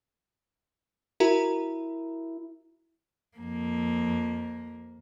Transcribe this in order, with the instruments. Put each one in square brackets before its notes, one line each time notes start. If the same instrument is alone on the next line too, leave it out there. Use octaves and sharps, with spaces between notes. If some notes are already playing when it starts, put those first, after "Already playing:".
[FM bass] E4 [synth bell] F#4 A#4 A#5
[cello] F2 A#3